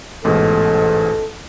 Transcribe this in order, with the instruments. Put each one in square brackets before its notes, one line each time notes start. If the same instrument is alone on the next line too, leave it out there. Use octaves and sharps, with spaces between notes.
[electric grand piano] A1 G#2 B2 [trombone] A4